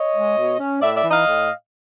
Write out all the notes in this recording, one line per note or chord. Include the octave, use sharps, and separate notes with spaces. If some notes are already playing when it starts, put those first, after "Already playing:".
Already playing: C#5 D#5
G#3
B2
C#4
A2 D5 E5
D5 E5
E3
D#5 F5
A2